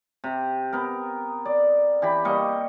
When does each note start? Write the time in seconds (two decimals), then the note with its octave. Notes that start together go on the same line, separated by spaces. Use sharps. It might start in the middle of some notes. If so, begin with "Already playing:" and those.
0.24 C3
0.73 B3 A#4
1.45 D5
2.02 E3 G4 B5
2.25 G3 A#3 D#5 C#6